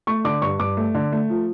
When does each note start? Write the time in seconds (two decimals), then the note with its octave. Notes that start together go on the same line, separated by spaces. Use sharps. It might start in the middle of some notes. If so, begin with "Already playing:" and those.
0.07 A3 C#6
0.25 D3 D6
0.42 G2 C#6
0.59 G2 D6
0.77 A3
0.95 D3
1.12 A3
1.30 F3